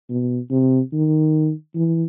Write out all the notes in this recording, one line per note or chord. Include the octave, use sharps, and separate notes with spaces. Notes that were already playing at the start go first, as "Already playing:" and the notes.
B2
C3
D#3
E3